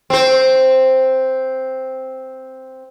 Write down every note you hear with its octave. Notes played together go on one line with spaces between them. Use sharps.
C4 C5